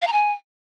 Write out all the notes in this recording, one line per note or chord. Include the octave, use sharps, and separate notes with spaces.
F5
A#5
G#5